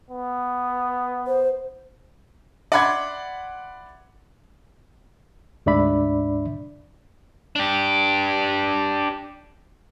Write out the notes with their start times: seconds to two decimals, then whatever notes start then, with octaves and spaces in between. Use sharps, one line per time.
0.10 B3
1.27 C5
2.72 D5 E5 F#5 B5 C6 G#6
5.66 D2 G#2 D4 D5 E5 B5
7.56 D4 G4